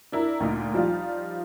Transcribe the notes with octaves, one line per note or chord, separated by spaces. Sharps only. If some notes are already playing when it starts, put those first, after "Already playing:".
D4 E4 A#4
D2 A#2 D#4
F3 G3 D#4 F4